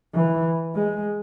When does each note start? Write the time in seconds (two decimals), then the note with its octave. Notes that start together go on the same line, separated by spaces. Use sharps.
0.13 E3
0.74 G#3